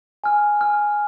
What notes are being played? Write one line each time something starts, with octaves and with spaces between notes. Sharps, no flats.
G#5 F6
G#5 F6